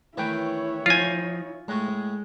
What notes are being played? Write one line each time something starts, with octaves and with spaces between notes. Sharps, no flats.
D#3 E3 A3 E4 B4 C#5 G5
F3 D#4 F4 C5 G#5
A2 G#3 A3